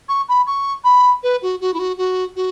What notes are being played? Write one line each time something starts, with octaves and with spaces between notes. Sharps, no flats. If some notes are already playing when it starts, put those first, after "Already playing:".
C#6
B5
C#6
B5
B4
F#4
F#4
E4
F#4
F#4
F#4